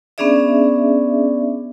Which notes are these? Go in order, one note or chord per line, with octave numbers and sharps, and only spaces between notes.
B3 C#4 D4 G#4 D5 E5